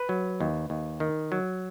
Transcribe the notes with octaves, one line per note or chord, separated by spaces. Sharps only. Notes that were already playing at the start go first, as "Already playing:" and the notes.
Already playing: B4
F#3
D#2
D#2
D#3
F#3